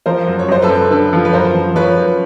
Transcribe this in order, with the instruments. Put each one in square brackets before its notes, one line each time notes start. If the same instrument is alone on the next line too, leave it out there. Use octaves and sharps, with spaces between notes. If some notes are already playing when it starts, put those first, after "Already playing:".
[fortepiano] F3 [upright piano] A#4 C5
[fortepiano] F#2
[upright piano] C#5
[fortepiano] F#2 [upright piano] C5
[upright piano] A4 B4
[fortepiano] F#2
[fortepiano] D3 [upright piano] A4 B4
[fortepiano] F3
[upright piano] B4
[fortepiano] F#2 [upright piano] A#4 C5
[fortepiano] F3
[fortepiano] F3 [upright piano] B4 C#5
[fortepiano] F#2